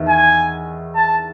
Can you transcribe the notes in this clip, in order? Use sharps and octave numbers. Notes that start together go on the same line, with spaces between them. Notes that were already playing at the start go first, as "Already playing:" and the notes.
Already playing: E2 D#3 E4
G#5
A5